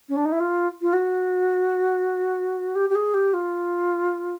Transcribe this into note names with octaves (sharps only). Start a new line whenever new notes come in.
C#4
D4
D#4
E4
F4
F4
F#4
G4
G4
G#4
G4
F4